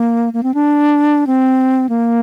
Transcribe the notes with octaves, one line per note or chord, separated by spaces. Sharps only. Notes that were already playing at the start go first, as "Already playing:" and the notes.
Already playing: A#3
A#3
C4
D4
C4
A#3